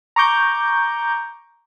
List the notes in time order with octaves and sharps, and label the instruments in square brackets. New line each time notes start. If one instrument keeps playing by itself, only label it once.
[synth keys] A#5 C#6 D6 G6